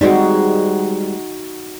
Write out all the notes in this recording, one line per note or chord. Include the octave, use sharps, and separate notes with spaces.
G3 G#3 C4 D#4 F#4